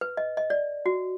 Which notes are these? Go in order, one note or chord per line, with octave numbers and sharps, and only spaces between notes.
B4
D#5
D#5
D5
F#4